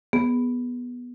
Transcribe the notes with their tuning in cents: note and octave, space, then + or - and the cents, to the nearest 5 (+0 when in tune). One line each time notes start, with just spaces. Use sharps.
B3 -10 G#4 +0